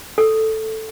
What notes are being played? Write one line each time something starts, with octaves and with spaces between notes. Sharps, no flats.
A4